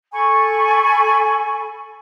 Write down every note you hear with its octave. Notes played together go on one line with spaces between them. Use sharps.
A4 G#5 B5 C#6